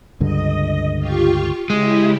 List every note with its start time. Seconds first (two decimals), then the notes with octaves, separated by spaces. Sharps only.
0.20 C#2 G2 D3 D#5
0.99 F4 G4 C#6
1.70 C#3 G#3 E4 G4